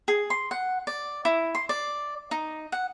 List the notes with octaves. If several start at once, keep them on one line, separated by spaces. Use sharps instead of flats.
G#4
C6
F#5
D5
E4
C6
D5
D#4
F#5